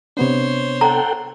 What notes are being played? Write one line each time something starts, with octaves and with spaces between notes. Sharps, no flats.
C3 B3 D4 C5 C#5
A4 F#5 G5 A#5